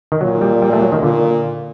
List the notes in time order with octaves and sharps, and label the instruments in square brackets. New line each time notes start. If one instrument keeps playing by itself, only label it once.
[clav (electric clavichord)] D#3
[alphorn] A#2 [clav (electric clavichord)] F#3
[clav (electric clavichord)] G3
G3
A3
F#3
D#3
[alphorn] A#2 [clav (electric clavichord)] D3